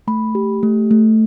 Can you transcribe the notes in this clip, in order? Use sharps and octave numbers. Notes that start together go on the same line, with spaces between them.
A3 B5
G4
A3
A3